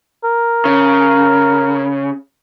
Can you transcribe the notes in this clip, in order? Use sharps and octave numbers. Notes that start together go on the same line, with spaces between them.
A#4
C#3